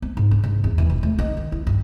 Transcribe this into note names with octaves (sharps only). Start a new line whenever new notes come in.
B3
G#2
D4
G#2
E2
E3
E1
A3
D#4
D#3
E4
G2